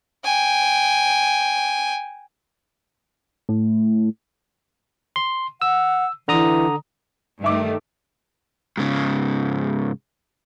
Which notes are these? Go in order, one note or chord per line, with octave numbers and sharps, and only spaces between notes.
G5 G#5
A2
C6
F#5 E6
D3 E3 A#5 D#6
G2 D#3 A3 E5 D6
G#2 C#3